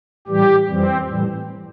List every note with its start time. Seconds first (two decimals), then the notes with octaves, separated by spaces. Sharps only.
0.27 A2 E3 G3 G4
0.68 F2 E3 G3 C4
1.09 A2 E3 G3